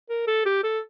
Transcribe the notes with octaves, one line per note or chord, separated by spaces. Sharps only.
A#4
A4
G4
A4